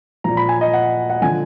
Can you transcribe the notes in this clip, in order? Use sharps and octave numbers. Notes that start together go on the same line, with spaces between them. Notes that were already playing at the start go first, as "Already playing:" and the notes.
A#2 F3 A#5
B5
G#5
D#5
F#5
F#5
D3 F3 G#5